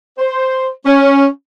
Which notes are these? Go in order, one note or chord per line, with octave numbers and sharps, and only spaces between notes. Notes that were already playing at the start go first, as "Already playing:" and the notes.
C5
C#4